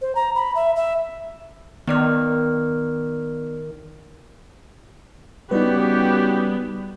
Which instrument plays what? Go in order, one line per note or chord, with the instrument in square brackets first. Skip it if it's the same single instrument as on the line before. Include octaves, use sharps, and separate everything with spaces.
[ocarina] C5
A#5
B5
E5
E5
[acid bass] D#3 [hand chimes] B3 D5 F6
[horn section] C#3 F#4 G4 [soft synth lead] G3 [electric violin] B3 [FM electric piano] D#4 B4